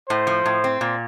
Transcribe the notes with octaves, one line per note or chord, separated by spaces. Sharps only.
A2 C5
F3
A2
C4
A#2